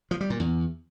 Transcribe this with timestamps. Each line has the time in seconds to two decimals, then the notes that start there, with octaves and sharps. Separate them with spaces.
0.11 F3
0.21 G3
0.30 A#2
0.40 E2